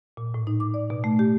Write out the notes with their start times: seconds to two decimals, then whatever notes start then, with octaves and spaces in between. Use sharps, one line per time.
0.17 A#2
0.34 A2
0.47 D#4
0.60 D6
0.74 D5
0.90 B2
1.04 A3
1.19 G4